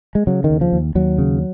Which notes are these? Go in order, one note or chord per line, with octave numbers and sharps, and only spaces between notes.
G#3
C#3 F#3
D#3
D#2
F3
D#2
D#2 F#3
C#3